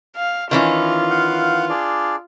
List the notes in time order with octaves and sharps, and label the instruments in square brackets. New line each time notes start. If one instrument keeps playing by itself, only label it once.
[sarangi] F5
[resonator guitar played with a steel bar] D#3 E3 C#4 [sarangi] F4
[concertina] F5 F#5
D4 G#4 D5